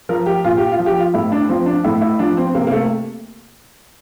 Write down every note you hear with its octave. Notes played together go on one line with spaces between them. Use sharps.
F3 A#4
G4
A#2 F4
G4
F4
F3
G4
F4
A2 E4
D4
F3 C4
D4
A2 E4
E4
F3 D4
C4
C3 A#3
A#3
A3